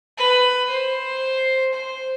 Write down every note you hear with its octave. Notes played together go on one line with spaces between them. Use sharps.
B4
C5
C5